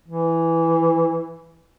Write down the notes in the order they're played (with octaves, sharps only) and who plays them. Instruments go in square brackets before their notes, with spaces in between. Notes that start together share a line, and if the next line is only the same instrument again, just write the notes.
[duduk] E3